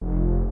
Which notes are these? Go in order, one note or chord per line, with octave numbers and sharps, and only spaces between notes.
F1